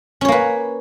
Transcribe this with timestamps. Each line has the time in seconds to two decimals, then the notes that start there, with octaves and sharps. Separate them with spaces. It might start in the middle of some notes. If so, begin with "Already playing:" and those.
0.21 C#4
0.25 C#5
0.28 A#3
0.32 B4